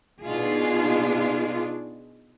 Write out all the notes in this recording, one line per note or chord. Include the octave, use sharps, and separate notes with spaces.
B2 D4 D#4 F4 G#4